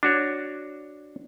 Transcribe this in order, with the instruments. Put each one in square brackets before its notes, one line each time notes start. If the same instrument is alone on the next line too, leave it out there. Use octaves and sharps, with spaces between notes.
[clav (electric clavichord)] D4 F#4 C#5